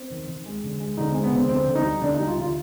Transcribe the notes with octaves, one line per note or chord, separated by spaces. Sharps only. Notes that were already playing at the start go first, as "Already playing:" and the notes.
Already playing: C4
D#3
D#3
G#3
D3
G#3
D3 D#4
G#3 C4
B3
D3 C4
D3 C4
D3
D#4
G3
D3 D4
G3 D#4
F4
D3
F4